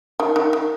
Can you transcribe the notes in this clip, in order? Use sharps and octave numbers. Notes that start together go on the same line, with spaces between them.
D#3
D#3
D#3